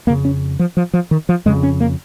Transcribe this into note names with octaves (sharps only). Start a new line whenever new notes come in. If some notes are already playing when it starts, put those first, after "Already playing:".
F2 C#3 A#3
C#4
F3
F3
F3
D#3
F3
F2 C#3 G#3
C#4
A#3